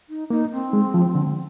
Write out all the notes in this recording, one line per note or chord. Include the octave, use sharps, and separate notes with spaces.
D#4
A#3 D#4
C4
G#3
F3
D3